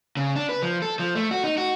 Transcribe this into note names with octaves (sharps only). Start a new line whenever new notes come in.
C#3
D4
B4
F3
A4
F3
A3
F#4
D#4
F#4